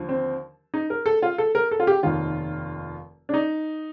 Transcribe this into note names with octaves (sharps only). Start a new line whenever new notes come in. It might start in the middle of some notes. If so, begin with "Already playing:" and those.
Already playing: D#2 D3 F3
C4
D#4
A#4
A4
F4
A4
A#4
A4
F4
G4
F1 D#2 D#3 F4
D4
D#4